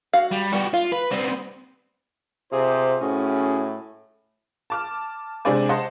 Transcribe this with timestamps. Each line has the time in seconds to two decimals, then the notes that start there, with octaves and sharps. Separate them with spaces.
0.13 F#4 F5
0.31 G3
0.52 G3 B3 F#4 G4
0.73 F4 F5
0.92 B4
1.12 G3 B3 C4
2.52 C3 F4 G#4 C5
3.01 A2 C#4 F#4 G#4
4.70 A5 D6 F6
5.45 C3 G#3 D4 C5 D5 G#5
5.69 C5 D#5 F#5 A5 C6